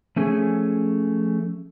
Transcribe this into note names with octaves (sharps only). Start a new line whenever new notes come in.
F3 A3 C#4 G#4